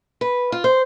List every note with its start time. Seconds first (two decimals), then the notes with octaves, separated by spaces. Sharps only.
0.21 B4
0.52 F4
0.64 C5